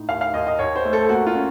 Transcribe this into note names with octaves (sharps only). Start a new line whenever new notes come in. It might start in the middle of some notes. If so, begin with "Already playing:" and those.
Already playing: A2 D#4
D#2 F5
F5
D#2 D#5
D#5
D#2 C#5
C5
A3
A4
A#3 F#4
F4
C#4